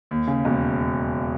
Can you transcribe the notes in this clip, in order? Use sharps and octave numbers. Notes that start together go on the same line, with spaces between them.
D#2
C#3
E1